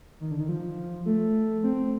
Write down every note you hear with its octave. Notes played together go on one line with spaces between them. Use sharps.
D#3
D3
D#3
F3
A3
C4